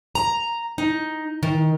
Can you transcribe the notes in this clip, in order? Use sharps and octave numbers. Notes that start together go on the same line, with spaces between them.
A#5
D#4
D#3